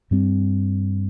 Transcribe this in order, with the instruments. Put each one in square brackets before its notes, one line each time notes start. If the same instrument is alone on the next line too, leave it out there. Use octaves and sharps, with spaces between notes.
[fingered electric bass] G2 G3 C4